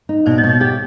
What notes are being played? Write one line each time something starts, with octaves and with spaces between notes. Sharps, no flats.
D#4
B2 C5 D5
C#5 D#5
B2
C#5 D#5
G4 C#5 D#5